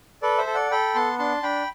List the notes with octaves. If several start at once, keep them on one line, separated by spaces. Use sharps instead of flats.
A4 B4 D5
C5 E5
A4
D5 F#5
A4 G5 B5
B3 A5 C6
D4 A5 C6
D4 G5 B5